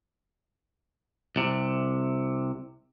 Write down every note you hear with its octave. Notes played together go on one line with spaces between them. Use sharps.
C2 C3